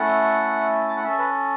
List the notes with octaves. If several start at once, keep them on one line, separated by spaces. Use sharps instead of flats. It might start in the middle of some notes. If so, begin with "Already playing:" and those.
Already playing: A3 C#4 E4 A4 F#5
A5
F#5
C#4 A4 E5
B4